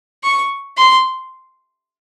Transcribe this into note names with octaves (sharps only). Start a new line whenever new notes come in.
C#6
C6